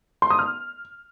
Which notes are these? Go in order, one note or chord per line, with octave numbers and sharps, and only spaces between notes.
C6
D#6
F6